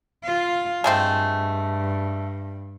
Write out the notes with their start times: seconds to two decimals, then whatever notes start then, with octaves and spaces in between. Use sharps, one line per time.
0.24 F4 F5
0.84 G2 G#3 A3 C4